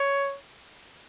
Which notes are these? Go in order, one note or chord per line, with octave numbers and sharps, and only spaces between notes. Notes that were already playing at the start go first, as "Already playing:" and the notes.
Already playing: C#5